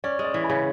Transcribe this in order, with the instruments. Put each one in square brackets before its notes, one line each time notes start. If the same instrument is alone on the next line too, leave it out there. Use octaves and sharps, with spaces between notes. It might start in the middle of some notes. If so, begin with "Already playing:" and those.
[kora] C#4 [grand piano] D5
[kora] G#3
[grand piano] D5
[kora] E3
[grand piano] G#5 B5
[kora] C#3